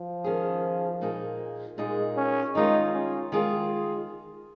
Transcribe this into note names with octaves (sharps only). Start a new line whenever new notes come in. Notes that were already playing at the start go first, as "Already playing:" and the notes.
Already playing: F3
D#3 C#4 G#4
A#2 A#3 D#4 G#4
A#2 G#3 A#3 D#4 G#4
C#4
D#3 G#3 D#4 F4 G#4
C#4
D#3 G#3 F4 G#4